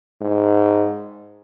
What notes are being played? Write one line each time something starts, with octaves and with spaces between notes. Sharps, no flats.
G#2